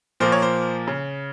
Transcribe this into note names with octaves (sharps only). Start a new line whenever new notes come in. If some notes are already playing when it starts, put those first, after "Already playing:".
A#2 F3 A#3 C5
C#5
C5
C#3